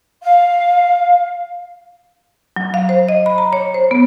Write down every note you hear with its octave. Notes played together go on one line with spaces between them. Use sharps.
F5
F#3
F5
C5
D#5
B5
A#5
C#5
C5
B3